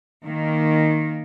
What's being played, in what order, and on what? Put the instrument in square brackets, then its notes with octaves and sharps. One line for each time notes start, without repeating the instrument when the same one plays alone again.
[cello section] D#3 A#3